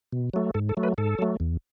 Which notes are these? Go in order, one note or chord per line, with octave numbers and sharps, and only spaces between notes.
B2
F#3 A3
G#2 A4
A4
F#3 A3
B4
G#2 A4
F#3 A3
E2